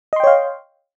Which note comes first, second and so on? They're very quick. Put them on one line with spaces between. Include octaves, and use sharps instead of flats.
D#5 C6 G5 C#5 F5